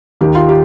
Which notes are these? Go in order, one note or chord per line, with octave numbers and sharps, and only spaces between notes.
D#2 D#3 A#3 G4
F4
G4